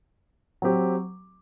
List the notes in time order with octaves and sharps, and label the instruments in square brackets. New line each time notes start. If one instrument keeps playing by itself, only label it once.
[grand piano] F#3 C4 G4